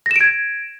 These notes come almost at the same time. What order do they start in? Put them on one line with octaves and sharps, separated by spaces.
A#6 E7 D7 G#6